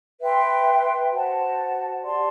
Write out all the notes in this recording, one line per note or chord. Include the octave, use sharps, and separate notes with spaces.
B4 E5 G5 C6
F#4 C5 F#5 A5
G4 D5 A5 C6